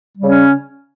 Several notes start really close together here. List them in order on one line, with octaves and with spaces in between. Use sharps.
G3 C#3 C#4